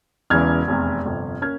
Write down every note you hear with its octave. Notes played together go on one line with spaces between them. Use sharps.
E1 E2 C#3 E3 F6 G#6
F1 E2 C3
G1 F2 C3
A#3 C#4 F6 G#6